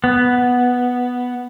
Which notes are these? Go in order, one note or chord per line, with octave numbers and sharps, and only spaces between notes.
B3